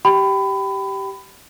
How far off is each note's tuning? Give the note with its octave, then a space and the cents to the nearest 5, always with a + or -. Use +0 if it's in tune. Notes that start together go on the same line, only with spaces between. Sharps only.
G4 -15 G5 -20 B5 +25